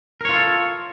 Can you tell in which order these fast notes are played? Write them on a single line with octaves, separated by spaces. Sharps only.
A#4 C#5 F4 A4